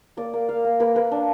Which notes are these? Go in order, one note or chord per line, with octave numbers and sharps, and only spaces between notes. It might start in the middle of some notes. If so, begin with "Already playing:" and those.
A#3 D5
A#3
A#3 F5
A#3
A#3 B4
A#3 B4
D4